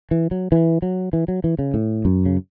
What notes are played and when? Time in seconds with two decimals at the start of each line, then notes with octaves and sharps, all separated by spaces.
0.11 E3
0.31 F#3
0.52 E3
0.82 F#3
1.13 E3
1.28 F#3
1.44 E3
1.59 C#3
1.74 A2
2.05 F#2
2.26 C#3